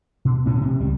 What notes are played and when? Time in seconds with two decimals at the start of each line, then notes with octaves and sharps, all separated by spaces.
0.25 B2
0.45 B1 A2 F#3 C#4
0.61 C3
0.80 C#2 G3